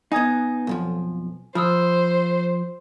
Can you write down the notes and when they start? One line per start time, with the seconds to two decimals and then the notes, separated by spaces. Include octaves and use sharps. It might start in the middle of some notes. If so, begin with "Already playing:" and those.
0.12 B3 D#4 G#5 D#6 G#6
0.67 B1 F2 F3
1.55 F3 C5 B5 D#6 E6